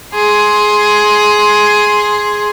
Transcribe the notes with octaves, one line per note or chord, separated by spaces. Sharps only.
G#4 C6